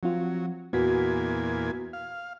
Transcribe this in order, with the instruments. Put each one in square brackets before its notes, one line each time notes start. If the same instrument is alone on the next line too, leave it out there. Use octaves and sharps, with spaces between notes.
[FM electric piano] F3 C4 F4 [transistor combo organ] F#3
[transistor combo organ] E2 A#2 G#5 [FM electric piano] B3 F#4 B6
[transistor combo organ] F5